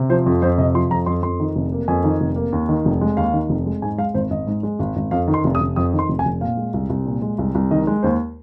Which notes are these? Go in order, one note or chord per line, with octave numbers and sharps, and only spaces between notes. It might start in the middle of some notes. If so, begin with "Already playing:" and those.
Already playing: C3
F3 C5
F2
F2 C5
C3 D#5
F3 C6
F2 A#5
F2 C6
F2 C6
D#3
F1
A#3
F2 G#5
D#3
F1
A#3
D#2
D#3
F1
G#3
D#2 F5
D#3
F1
G#3
G#2 G#5
G#3 F5
G#1 C5
G#1 D#5
G#2
G#3
G#1
G#1
F2 F5
D#3
C6
F1
D#6
F1
F2 D#6
D#3
C6
F1
G#5
F1
A#2 F5
G#3
C2
C2
A#2
G#3
C2
C2
D#3 D#5
G#3
D#2 C5